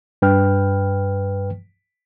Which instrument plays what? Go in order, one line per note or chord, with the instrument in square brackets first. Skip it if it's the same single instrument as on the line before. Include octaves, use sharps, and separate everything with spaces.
[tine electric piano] G2 B4 G5 F6